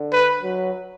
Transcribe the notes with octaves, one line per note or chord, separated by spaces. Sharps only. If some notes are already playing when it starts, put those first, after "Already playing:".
Already playing: D3
B4
F#3